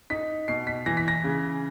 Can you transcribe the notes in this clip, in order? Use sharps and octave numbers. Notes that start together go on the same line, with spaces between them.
D#4 B6
B2 C7
B6
E3 A#6
B6
A#6
C#3